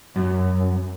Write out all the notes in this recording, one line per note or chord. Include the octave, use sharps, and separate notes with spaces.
F#2